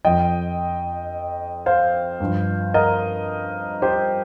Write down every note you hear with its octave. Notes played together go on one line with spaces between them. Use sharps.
F2 F3 D#5 G5
C5 F5
G2 F3
A#4 D#5
G4 C5